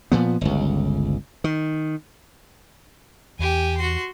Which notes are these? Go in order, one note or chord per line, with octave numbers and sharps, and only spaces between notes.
A#2 F3 B3
G1 C#2
D#3
E2 G4 G#5
F#4 C6